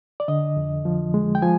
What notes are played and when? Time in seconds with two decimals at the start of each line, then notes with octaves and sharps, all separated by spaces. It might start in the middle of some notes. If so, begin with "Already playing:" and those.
0.20 D5
0.28 D3 D#5
0.56 F2
0.85 F3
1.14 G#3
1.35 G5
1.42 F3 G#5